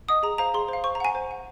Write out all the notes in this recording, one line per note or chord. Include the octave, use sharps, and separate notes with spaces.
D#5 F#5 D#6
G#4 A#5
C5 F5 A#5
G#4 C6
C5 F5
C5 C#6
A#5
F#5 G#5
C5
F#5